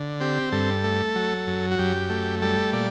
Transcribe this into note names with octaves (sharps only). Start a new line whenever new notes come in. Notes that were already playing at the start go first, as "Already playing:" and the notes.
Already playing: D3
C4 G4
G2 A4
A3
F#3
F#2
F#4
F#2 G4
A3
G3 A4
A#2 D5